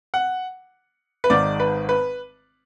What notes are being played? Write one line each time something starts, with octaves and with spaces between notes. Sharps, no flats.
F#5
B4
G#1 G#2 D#3 D5
B4
B4